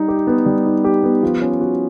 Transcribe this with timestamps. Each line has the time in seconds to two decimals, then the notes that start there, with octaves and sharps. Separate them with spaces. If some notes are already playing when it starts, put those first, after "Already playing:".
Already playing: G3 D#4
0.08 G4
0.27 B3
0.46 G3
0.65 D#4
0.84 G4
1.03 B3
1.23 F3
1.42 C#4
1.61 F#4